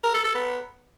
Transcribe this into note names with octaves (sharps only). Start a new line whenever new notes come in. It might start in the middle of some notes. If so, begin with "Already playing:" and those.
A#4
A4
A4
B3